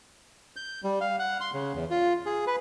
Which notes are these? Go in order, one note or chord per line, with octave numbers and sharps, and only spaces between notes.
G6
G3
F5
F#5
C6
C#3
E2
F4
G#4
B4